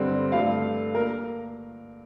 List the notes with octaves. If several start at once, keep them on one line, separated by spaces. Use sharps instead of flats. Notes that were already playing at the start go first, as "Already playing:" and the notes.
Already playing: G2 D3 G3 C4
G2 D3 A3 F5
A#3 A#4